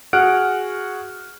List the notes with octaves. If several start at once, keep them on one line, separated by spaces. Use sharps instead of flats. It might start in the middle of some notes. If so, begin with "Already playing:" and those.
F#4 G#4 F#5 F6 F#6 D7